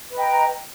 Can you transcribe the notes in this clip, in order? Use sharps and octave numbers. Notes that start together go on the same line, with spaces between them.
B4 D#5 G5 A#5